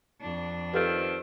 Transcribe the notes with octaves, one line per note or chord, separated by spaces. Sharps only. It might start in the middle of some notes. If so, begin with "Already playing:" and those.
F2 D4
D#3 F3 C4 G4 A4 B4